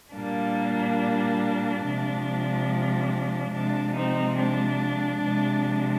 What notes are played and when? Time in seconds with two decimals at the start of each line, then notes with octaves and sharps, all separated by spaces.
0.14 A#2 G3 A#3 D4
1.85 C3 F3 G#3
3.53 C3 F3 G#3 D4
3.95 C4 D#4
4.37 D4
5.23 C3 F3 G#3